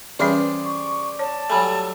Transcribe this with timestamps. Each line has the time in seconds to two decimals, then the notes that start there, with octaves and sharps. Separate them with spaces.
0.19 E3 G3 C#4 G#4 C5 D5 G5
0.64 C#6
1.19 C#5 A5
1.50 F#3 G3 A3 G#5 B5